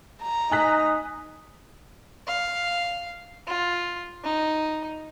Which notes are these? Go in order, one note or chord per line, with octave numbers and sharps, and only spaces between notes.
A#5
D#4 G#5 F#6 B6
F5
F4
D#4